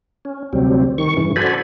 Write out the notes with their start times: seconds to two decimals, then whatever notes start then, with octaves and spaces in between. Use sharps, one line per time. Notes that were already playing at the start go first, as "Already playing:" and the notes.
0.25 C#4
0.53 D2 C3 F#3 G3 C4
0.98 D#3 C#6
1.17 G2 C#3 E3
1.36 F#4 A4 C5 D5 G#5 B5